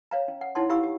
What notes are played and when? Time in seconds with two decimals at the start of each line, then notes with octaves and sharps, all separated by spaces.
0.11 C#5 F5 A#5
0.28 C#4
0.41 F#5
0.55 D#4 E4 C#5 F#5 A5 C6
0.69 E4 G4 F5 B5 C#6 E6
0.83 G4